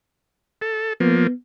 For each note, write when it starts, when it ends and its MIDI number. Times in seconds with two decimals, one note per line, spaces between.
0.62 0.93 69
1.00 1.27 53
1.00 1.27 58
1.00 1.32 59